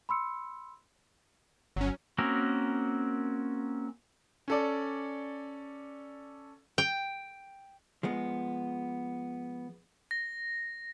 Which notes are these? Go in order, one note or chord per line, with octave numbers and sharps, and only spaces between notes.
B5 C6 E6 C#7
G1 F#3 C#4
A#3 C4 C#4 F#4 A#4
C#4 A4 D5
G5
F3 G#3 B3
A#6